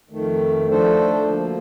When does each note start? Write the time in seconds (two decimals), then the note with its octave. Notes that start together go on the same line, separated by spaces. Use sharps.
0.10 F2 D#3 A3
0.68 F3 A3 D4 A4 C5
1.24 D2 D3 F3 A#3